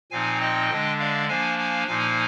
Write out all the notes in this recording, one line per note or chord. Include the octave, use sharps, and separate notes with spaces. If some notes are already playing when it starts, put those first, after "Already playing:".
A#2 F3 C4 D#4 F5 G#5
D#5 G5
D3 G#3 D4
D5 F5
F3 A#3 D4 F5 G#5
F5 G#5
A#2 F3 A#3 D#4 F5 G#5